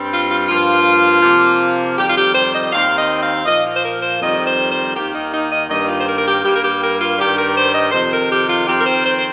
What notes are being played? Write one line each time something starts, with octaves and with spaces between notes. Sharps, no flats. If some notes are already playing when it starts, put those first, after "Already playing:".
Already playing: G2 G3 C4
F4
F4
G2 F3 A#3 F4
C3 F3 A#3
F2 D#3 G3 G4
F4
G4
C5
D#5
D#2 D#3 C4 F5
D#5
F5
A#2 F3 A#3 D#5
F4
C5
A#4
C5
F2 D#3 G3 C4 D#5
C5
C5
D#2 D#3 A#3 G4
D#4
D#4
D#5
G2 D#3 G3 A#3 D#5
F4
C5
A#4
A#4
G4
G2 G3 A#3 G4
A#4
G4
A#4
F4
G2 D#3 G3 G4
A#4
C5
D#5
F2 C3 D#3 C5
A#4
G4
F4
F2 D#3 C4 G4
A#4
C5
C5
C5